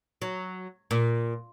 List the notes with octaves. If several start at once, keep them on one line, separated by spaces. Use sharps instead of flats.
F#3
A#2